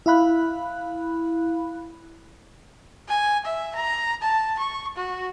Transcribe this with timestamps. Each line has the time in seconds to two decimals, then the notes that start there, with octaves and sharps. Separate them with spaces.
0.06 E4 F5 B5 F#6
3.09 G#5
3.46 E5
3.76 A#5
4.22 A5
4.59 C#6
4.97 F#4